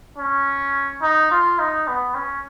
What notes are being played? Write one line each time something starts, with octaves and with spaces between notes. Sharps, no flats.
C#4
D#4
F4
D#4
B3
C#4